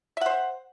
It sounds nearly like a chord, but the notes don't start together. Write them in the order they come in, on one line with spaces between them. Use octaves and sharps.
E5 F#5 C5